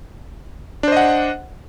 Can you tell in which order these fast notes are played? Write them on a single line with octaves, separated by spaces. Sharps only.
D4 C5 D#5 F#5